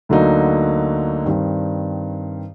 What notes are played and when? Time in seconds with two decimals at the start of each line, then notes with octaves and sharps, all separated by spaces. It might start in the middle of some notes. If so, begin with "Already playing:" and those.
0.09 D2 D3 F#3 A#3 D#4
1.25 G2 D#3 G3 C4